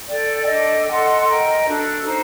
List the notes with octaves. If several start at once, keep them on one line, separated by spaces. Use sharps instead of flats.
A4 D5 G5
D4 A4 D#5 G5
A4 D#5 F#5 C6
A#4 D#5 G5 A#5
D4 F#4 A4
D#4 F#4 C5